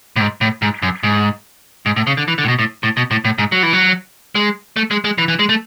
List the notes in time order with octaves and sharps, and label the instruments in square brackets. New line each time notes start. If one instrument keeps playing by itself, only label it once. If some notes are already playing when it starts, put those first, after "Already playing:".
[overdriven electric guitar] A2
G#2
A2
G#2
F#2
G#2
G#2
A2
C#3
D3
E3
D3
A2
B2
A2
A2
B2
A2
A2
G#2
F#3
E3
F#3
G#3
A3
G#3
G#3
E3
E3
G#3
A3